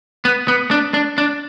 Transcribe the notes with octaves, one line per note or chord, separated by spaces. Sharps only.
B3
B3
D4
D4
D4